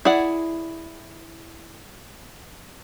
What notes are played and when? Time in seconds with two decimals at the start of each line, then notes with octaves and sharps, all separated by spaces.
0.05 E4 G#4 D5 F#5